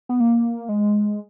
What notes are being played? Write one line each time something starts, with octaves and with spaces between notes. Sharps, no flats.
B3
A#3
G#3